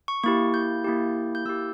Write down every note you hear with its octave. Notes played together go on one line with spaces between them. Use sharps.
C#6
A#3 E4 G4 C#6
G6
A#3 E4 G4
G6
A#3 E4 G4 E6